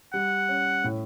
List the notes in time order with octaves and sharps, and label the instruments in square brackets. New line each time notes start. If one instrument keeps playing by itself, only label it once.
[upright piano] G3 [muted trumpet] F#5
[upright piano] C#4
A2